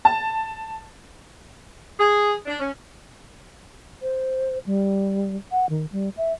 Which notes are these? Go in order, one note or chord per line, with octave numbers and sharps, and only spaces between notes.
A5
G#4
D4
C#4
C5
G3
F#5
D#3
G3
E5